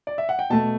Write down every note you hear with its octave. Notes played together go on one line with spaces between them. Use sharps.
D5
E5
F#5
G5
B2 A3 A5